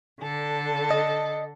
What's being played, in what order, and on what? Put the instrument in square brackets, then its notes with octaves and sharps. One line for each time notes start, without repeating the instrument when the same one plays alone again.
[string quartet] D3 A4
[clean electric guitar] D#5